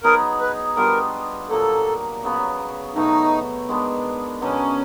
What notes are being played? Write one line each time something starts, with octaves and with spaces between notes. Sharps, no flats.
F#3 B3 D#4 G#4 A#4
B4
G3 B3 D4 F4 A#4
A#2 F#3 A#3 A4
C#3 F#3 B3
B2 F#3 A3 D#4
D#3 G#3 B3 D4
B2 F#3 B3 C#4 D4